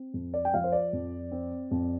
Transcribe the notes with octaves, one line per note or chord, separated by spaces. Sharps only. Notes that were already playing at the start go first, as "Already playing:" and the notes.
Already playing: C4
F2
D5
G5
F3 F5
C5
D5
F2
C4
F2